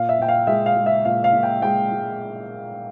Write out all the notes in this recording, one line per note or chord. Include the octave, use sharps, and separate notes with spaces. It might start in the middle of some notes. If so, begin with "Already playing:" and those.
Already playing: A#2 F5
E5
A#2 G5
F5
G#3 E5
F5
G#3
E5
A#2 F5
F5
A#2
G5
G#3 G5
G#3